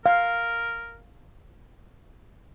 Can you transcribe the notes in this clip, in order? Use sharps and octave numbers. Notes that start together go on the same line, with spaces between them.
A#4 F5